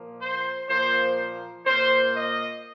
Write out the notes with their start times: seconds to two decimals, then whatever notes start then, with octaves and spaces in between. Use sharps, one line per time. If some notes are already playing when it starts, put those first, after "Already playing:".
Already playing: A#2 F3 A#3
0.20 C5
0.69 A#2 F3 A#3 C5
1.66 A#2 A#3 C5
2.15 D#5